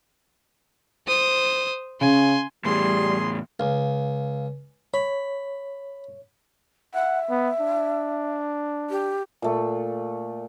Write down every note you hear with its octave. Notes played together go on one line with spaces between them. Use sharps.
C5 D#6
C#3 G#5 C6
E2 A2 G3 G#4 C6
C#2 F5
C#5 B5
E5 F#5
B3
D4
G4
A#2 A3